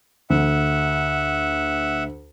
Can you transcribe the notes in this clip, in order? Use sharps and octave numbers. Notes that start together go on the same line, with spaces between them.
D2 E5 F#5